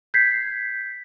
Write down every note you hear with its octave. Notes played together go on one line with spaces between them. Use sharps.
G6 G#6 B6 C7